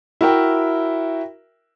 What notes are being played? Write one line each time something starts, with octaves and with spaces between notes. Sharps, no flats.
E4 F#4 A#4 E5 G5